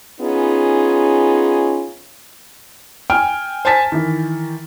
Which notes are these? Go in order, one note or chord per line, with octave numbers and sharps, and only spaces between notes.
B3 C#4 D#4 F4 G#4
G5 G#5 F6 D7
C5 G#5 A5 A6 B6
D#3 E3